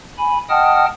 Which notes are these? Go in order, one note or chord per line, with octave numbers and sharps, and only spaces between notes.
G#5 B5
D#5 F#5 G5 A5 D#6 F6